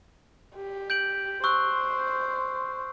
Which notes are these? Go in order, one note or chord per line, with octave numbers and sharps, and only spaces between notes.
G4
G6 D7 F#7
C5 C#6 E6 F#6